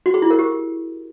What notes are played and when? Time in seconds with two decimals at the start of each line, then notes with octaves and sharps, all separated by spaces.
0.06 F#4
0.14 G#4
0.22 E4
0.30 A#4
0.39 G4